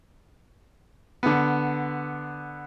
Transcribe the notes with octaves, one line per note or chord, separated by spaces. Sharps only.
D3 B3